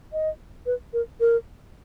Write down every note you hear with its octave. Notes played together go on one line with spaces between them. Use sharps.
D#5
B4
A#4
A#4